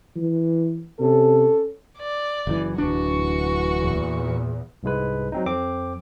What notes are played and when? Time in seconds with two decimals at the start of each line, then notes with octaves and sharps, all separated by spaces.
0.16 E3
1.00 C3 C#4 A4
1.98 D5
2.47 F#1 E3
2.78 D1 G#1 E3 D4 F#4 C#6
3.79 E2 A#2
4.83 C2 G#2 G#3 B4
5.32 F#3 C4 D#4
5.46 F2 C4 D6